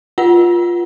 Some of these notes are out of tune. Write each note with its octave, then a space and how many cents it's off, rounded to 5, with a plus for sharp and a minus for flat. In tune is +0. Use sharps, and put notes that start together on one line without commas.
F4 +0 B4 -35 F#5 +0